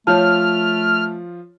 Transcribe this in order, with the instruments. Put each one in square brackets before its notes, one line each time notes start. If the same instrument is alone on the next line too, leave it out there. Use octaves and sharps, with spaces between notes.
[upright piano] F3 F4 [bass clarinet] A3 [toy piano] C#5 A5 [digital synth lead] F6